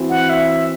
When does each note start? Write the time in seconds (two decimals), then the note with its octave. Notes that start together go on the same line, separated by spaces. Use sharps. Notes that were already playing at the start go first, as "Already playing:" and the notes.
Already playing: E3 C4 F#4
0.10 F#5
0.29 E5